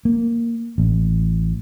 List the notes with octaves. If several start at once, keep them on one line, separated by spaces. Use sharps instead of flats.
A#3
A1